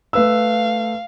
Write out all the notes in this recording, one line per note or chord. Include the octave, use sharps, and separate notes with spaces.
A3 B4 F5 E6